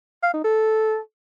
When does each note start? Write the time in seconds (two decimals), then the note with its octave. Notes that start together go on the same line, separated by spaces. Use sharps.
0.23 F5
0.34 D#4
0.44 A4